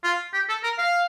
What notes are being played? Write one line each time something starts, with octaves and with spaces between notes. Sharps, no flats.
F4
G4
A4
A#4
F5